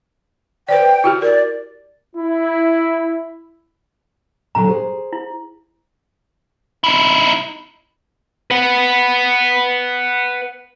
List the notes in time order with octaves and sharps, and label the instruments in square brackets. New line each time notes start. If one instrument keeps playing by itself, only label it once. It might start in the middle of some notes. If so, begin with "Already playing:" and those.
[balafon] B4 C5 D5 [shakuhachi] G5
[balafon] E4 F#4 G4
[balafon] A#4 [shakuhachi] D5
[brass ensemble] E4
[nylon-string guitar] A#2 D3 F#3 [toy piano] A#5
[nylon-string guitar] G#4 C5
[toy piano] E4
[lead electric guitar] D#4 E4
[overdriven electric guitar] B4 F#5